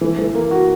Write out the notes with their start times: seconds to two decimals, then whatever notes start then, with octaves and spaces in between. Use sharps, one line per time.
0.01 E3
0.19 E3
0.34 A#3
0.51 F#4